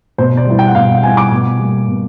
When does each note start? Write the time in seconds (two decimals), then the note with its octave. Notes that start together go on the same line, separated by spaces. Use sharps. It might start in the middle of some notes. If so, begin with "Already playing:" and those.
0.18 B2 C5
0.37 D5
0.46 G3 B3 E4
0.59 G5
0.67 F#5
0.75 B2 F5
1.03 G3 B3 E4 G#5
1.17 D6
1.32 B2
1.59 G3 A#3
1.88 B2